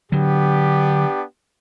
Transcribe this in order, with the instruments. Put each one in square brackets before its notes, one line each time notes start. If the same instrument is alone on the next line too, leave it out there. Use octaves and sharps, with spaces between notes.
[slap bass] D3 F#3 [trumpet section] B3 D4 G4